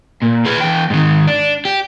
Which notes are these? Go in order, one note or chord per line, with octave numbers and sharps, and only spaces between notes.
A#2
G#4 B4
E2 G5
G#2 D#3
D4
G4